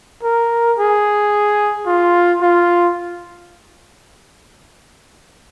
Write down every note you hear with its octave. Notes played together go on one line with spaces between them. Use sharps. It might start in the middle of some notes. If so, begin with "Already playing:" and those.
A#4
G#4
F4
F4